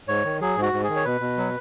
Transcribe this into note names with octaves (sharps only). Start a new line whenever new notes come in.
G#2 C#5
D#3
F#3 G#4
G#2
F#4
G#2
G#4
D#3
C#5
B2 B4
B2
F#3